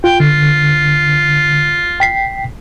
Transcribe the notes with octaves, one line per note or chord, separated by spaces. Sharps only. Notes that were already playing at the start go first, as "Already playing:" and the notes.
F4 G5
D3 F4
G5 B6 C7